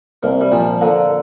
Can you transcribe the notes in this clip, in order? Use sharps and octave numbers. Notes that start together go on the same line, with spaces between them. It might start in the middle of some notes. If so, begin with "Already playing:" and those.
C2 A#3
G3
A#2 F3
D3 A#3